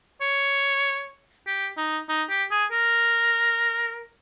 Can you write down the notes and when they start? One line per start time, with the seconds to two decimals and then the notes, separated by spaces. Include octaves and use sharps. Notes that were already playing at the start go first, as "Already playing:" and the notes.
0.21 C#5
1.47 G4
1.77 D#4
2.09 D#4
2.29 G4
2.51 G#4
2.71 A#4